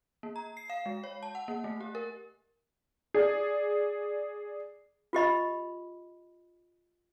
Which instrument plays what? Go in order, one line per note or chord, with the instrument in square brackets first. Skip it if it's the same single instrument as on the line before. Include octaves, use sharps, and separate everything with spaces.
[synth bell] A#3
A#5
C7
F5
G#3
C#5
A5
F#5
A#3
A3
G4
A#4
[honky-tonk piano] G#4 D5
[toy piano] F4 G4 D#5 B5